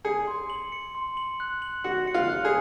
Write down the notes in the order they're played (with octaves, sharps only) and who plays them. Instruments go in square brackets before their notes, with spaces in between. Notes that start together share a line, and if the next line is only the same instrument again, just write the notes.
[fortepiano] G#4 [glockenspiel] C#7
[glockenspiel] C6
F#7
C#7
C6
F#7
F#6
F#7
[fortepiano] F#4 [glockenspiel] C#7
[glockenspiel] C#7
[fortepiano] F4
[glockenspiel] F#6
[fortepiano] G#4